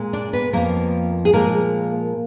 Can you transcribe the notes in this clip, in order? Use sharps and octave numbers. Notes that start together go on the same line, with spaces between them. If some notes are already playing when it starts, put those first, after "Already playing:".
Already playing: A#2 G#3
D4 D5
B3 B4
F2 F3 A#3 B3 A#4
G#4
A#2 F3 G#3 A#3 A#4